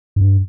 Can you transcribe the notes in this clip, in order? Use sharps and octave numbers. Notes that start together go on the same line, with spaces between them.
G2